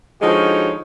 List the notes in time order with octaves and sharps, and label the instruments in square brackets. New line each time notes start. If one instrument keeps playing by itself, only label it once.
[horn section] D3 F3 G#3 D#4 F#4 C#5